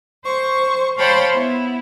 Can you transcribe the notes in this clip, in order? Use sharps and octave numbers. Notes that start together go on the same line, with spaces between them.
C5 C#6
C5 C#5 F5 G5 A5 B5
B3 E4